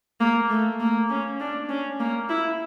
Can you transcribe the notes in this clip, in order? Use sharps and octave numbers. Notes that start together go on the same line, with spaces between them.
A#3
A3
A#3
C#4
D4
C#4
A#3
E4